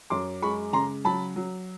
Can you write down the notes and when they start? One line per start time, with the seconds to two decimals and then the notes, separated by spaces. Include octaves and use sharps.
0.10 F#2 C6 D6
0.42 G#3 B5 C#6
0.73 C#3 A#5 C6
1.05 F#3 A5 B5
1.36 F#3